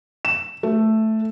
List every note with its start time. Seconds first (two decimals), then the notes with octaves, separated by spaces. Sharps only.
0.25 E7
0.63 A3